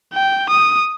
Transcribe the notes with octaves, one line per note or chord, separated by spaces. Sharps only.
G5
D#6